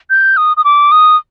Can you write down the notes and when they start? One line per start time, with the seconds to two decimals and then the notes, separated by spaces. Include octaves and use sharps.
0.10 G6
0.37 D#6
0.57 D#6
0.64 D6
0.92 D#6